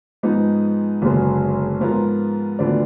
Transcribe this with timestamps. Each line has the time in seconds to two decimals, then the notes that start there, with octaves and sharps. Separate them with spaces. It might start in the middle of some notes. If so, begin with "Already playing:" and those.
0.23 G#2 F3 B3 D#4
1.02 F#1 F#2 D3 G#3 B3
1.80 G#2 F3 B3 F4 A#4
2.59 D2 D3 F3 B3 D4